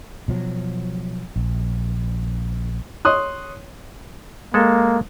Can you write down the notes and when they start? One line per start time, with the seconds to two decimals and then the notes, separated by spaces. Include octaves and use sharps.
0.28 B2 F3 F#3
1.36 A#1
3.05 C#5 C6 D#6 F#6
4.54 G#3 A#3 A4